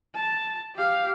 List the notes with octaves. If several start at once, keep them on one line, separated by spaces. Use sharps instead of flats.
A5
G4 F5